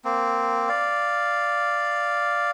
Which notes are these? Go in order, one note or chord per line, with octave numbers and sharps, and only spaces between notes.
A#3 C4
D5 F5